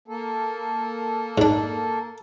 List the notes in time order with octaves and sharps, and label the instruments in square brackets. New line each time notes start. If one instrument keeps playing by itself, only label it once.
[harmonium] A#3 A4
[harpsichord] G#2 D4